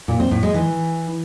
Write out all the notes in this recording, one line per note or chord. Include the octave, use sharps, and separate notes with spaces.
A#2
C4
A2
G#3
E3